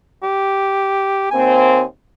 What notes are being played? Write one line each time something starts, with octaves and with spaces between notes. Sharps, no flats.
G4
D#2 A#3 C4 G#5